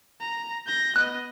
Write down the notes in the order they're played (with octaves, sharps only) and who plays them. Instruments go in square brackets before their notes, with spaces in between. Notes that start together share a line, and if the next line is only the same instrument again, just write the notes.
[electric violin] A#5
G6 A#6
[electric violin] B3 D#5 [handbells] F#6